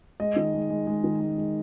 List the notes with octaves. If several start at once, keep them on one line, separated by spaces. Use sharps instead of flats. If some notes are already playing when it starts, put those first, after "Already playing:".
G#3 D#5
D#3
G#3
G#3
G#3
D#3
G#3
G#3